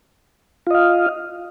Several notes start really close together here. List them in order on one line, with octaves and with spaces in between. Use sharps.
F4 D#5 F5